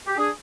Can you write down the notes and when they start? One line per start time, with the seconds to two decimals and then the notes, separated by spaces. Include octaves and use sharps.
0.07 G4
0.17 D4 G#4